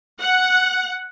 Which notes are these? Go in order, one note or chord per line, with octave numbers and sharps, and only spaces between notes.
F#5